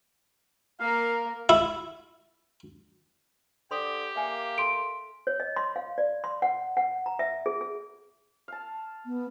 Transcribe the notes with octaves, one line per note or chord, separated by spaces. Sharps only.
A#3 A#4 F5
E4
D3 G4 C5 C6 D#6
A#3 E5 G#5
A4 C6 D7
C#5
D#5
C6
F5
D5
C6
F#5
F#5
A#5
E5
G#4
G#4
F5 A5
B3